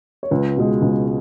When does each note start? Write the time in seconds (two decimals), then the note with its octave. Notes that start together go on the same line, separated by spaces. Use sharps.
0.23 C#5
0.31 C#2 B4
0.57 B2 G#3
0.82 C#2